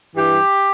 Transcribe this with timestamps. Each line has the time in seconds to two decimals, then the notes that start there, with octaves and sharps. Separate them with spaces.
0.16 G2 E3 G3 G4